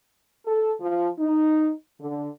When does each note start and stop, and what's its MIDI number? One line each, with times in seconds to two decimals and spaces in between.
0.45 0.73 69
0.80 1.09 53
1.19 1.71 63
1.99 2.29 50